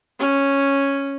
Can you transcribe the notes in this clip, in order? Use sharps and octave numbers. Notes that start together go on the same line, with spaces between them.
C#4